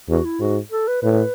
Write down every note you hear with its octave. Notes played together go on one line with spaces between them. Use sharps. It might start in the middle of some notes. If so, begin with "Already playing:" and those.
E2 F#4
E4
G#2 F#4
A4
B4
A2 B4